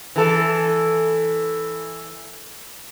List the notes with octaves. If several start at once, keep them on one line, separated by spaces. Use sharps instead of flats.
E3 A4